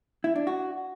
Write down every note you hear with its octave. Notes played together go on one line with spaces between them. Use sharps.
E4
D4
F#4